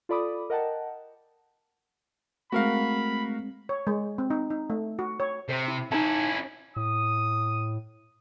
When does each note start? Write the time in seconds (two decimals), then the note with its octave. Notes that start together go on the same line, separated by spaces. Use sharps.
0.09 F4 A4 D5 B5 D6 D#6
0.50 A#4 D#5 F#5 G5 A5
2.52 G#3 A3 C4 F#4 A#4 F5 B5
3.69 C#5
3.87 G#3
4.18 C4
4.30 D#4
4.50 D#4
4.70 A3
4.99 F#4
5.20 C#5
5.49 C3 C5
5.68 E4
5.92 C#4 D#4 E4 G#5 A5
6.76 A2 D#6